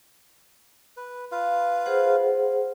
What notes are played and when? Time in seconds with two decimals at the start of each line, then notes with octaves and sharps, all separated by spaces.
0.97 B4
1.32 F4 B4 F5
1.86 G#4 C5 F#5